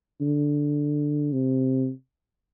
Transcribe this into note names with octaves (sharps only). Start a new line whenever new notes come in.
D3
C3